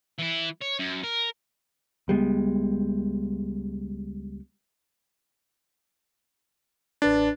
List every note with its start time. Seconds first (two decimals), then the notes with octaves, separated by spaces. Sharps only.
0.19 E3 E4
0.61 C#5
0.79 F#2
1.04 A#4
2.08 C#2 G3 G#3 B3
7.02 A1 D4 B4 A6